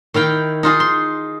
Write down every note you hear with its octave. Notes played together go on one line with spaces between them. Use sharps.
D#3 E4 F5 G5
D#4 F4 G#4
C6